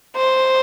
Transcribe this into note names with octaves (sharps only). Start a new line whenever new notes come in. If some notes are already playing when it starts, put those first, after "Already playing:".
C5